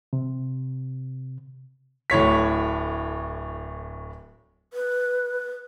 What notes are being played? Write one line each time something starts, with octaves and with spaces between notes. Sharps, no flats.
C3
D1 A2 C#5 B6
B4